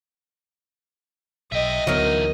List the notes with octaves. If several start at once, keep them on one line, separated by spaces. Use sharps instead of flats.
B1 D#5 E5 G5
D2 E3 F#3 B3 D#4 A#4